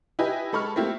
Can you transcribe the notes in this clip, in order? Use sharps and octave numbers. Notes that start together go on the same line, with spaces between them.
E4 G4 B4 D#5 G#5
G#3 A4 B5 C#6 F6
A3 A#3 C4 E4 F4 G4